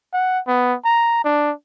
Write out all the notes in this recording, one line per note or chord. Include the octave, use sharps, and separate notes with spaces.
F#5
B3
A#5
D4